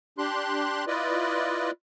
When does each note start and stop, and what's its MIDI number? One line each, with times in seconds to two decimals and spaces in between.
0.18 0.85 62
0.18 0.85 67
0.18 0.85 84
0.18 0.85 90
0.87 1.71 64
0.87 1.71 65
0.87 1.71 71
0.87 1.71 74
0.87 1.71 75